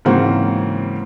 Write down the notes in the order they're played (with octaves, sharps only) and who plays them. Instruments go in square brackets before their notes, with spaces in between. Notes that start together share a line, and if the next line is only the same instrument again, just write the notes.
[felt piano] G#2 C#3 E3 A#3 C4 F#4